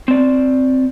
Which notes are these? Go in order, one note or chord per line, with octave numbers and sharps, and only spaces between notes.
C4 D5